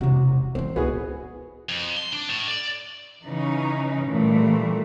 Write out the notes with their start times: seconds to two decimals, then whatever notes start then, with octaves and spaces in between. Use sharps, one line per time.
0.01 E1 C3 F#4
0.55 E3 F#3 C4
0.76 C#2 A2 B3 F#4 G#4
1.69 F2
1.97 C6
2.13 D4
2.30 A2
2.48 D5
3.23 C#3 E3 C#4 D#4
4.06 A#2 E3 G3 A3